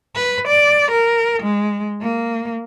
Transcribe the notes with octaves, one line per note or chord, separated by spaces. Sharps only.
B4
D5
A#4
G#3
A#3